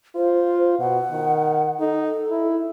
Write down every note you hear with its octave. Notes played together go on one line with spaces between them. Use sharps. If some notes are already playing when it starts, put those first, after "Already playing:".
F4 C5
B2 F#5
D#3
D#4 A4
E4